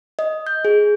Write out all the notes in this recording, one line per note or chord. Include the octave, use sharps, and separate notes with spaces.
D#5
G6
G#4